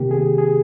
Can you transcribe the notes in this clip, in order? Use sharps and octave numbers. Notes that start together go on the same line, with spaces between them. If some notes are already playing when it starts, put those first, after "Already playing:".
Already playing: C3 D#3 A#3 G4
G#4
G#4